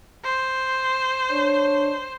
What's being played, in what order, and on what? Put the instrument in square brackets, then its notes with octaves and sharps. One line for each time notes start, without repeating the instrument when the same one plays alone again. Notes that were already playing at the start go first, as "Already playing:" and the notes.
[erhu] C5
[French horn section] D4 C#5